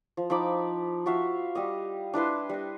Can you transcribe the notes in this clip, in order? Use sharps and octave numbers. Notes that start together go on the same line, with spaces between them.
F3
F3 D#4 B5 D6
F4 F#4 E5 F5
G3 G4 D#5
D4 E4 B4 C6
G3 D#5